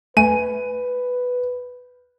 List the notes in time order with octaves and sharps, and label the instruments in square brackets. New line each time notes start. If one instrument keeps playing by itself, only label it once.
[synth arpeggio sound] A3 [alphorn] B4 [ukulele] G#5 [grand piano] D#7